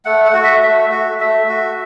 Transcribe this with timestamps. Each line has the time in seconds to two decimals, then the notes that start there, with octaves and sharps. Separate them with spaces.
0.05 A3 F#5
0.25 F#5
0.34 F#4
0.44 E5
0.63 A3 E5
0.91 F#4
1.20 A3 E5
1.49 F#4